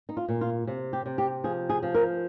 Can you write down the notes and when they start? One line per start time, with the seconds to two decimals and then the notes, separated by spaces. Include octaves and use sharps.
0.09 D#4
0.17 F4
0.28 A#2
0.41 F4
0.67 C3
0.93 G4
1.06 C3
1.18 G4
1.44 F3 G#4
1.69 G#4
1.83 F3
1.94 A#4